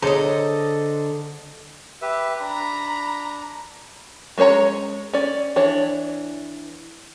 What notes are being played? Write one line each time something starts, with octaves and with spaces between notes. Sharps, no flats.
D3 G#4 A4 C5 C#5 D#5 A#5
G4 B4 E5
D4 A#5 B5
G#3 C#4 C5 C#5 A#5
C#4 D5
E3 D4 C#5